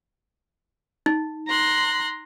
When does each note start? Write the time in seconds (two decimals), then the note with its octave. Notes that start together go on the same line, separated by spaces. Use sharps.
1.06 D#4
1.47 A#5 C6 F#6